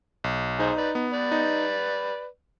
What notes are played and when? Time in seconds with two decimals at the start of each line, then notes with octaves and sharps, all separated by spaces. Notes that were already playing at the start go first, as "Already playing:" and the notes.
0.24 B1
0.59 D#4 G#4 C5
0.78 B4 D5
0.95 B3
1.13 B4 D5
1.32 D#4